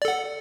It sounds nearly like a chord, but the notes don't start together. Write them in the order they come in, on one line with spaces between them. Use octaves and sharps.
D5 A4 F#5